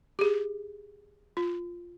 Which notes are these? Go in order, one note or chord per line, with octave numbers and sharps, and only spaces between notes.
G4 G#4
F4